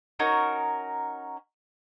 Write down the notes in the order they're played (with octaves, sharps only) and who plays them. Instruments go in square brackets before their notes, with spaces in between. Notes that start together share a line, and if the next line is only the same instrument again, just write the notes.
[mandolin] C#4 D#4 F#4 A#4